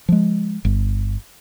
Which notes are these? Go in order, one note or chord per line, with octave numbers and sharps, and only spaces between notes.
F3 G#3
G1